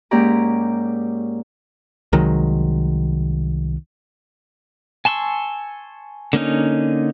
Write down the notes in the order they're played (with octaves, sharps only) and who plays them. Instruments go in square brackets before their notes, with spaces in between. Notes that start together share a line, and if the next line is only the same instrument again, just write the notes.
[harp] G#2 A#3 C#4 G4 D5 A#5
[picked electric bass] C2 D#3 F#3 G#3
[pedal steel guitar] G#5 A5 C6 C#6 E6
D3 A#3 C#4 D#4